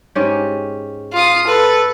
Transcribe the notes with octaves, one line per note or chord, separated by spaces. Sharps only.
G#2 C#4 G4
F4 D#6
A4 B4